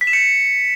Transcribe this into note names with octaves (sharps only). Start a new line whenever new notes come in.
B6
E7
C#7